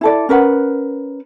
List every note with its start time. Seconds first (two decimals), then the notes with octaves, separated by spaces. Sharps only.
0.01 E4 A4 D5
0.29 C#4 A#4 B4 F#5